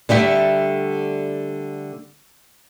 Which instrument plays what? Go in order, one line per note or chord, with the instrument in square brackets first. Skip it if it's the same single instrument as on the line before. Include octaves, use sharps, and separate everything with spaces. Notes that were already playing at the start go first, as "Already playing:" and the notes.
[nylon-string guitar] D3 G3 A3 E5